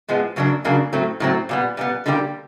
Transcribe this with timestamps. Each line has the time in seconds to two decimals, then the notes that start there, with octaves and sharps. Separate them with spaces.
0.08 A2 F3 G#3 B3
0.36 F#2 C#3 F#3 A#3 D4
0.65 F#2 C#3 F#3 A#3 D4
0.93 A2 F#3 A3 C4
1.20 A2 F#3 A3 C4
1.49 A#2 G3 B3
1.77 A#2 G3 B3
2.06 D3 G3 A#3 D#4 G4